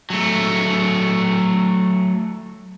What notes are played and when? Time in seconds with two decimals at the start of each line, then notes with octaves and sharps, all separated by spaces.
0.10 F#3 A3